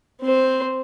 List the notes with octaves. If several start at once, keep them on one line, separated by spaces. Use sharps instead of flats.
C4 C5